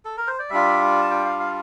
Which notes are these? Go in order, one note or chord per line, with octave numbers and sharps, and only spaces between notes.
A4
A#4
C5
D5
G3 D4 F4 E5
A5
G5
F5
F5